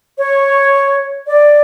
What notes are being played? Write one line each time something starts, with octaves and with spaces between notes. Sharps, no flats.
C#5
D5